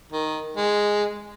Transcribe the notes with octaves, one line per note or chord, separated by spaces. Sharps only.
D#3
G#3